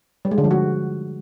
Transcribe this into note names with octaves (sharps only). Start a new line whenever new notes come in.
G3
G#3
D3
F3
F#4